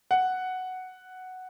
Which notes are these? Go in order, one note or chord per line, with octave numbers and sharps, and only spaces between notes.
F#5